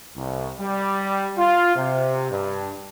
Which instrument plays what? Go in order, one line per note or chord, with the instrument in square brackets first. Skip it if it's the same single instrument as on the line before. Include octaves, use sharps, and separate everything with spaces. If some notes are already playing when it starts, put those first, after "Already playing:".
[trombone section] C2
G3
F4
C3
G2